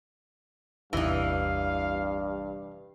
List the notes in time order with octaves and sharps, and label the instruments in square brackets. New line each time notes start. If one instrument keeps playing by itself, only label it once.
[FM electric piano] A1 E2 C3 [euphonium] G2 [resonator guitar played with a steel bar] E3 D#4 [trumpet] F5